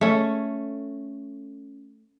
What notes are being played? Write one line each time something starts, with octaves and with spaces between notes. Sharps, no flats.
A3 C#4